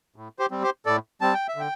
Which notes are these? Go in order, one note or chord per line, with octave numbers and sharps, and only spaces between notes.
A2
G4 C5
G3 C4
G4 C5
A2 A4 D5
G3 C4 A5
G5
E5
D3 G5